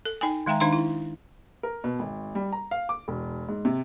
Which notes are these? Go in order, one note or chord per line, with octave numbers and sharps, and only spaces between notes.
A4
D#4 G5 G#5
D#3 G#3 E5 G5 A#5
D#3 D4 D#4 F5 A#5 C6
E4
A#4
B2
G#1
G3
A#5
F5
D6
E1
G#2
C3